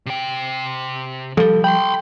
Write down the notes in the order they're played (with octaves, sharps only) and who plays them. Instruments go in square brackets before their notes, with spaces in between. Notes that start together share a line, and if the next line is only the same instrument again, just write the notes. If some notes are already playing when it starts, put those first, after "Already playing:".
[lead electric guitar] C3 G5
[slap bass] F3 G3 [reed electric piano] A4
[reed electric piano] G5 [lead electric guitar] B5 C6